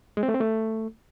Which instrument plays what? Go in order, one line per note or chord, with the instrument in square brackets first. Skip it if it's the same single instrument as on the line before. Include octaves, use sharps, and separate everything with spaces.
[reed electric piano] G#3
C4
A3
C4
A3